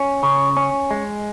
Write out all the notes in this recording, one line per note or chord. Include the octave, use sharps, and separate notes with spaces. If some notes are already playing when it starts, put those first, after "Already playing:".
Already playing: C#4
C#3
C#4
G#3